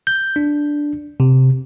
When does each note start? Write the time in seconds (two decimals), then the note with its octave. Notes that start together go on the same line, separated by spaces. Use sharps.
0.07 G6
0.36 D4
1.20 C3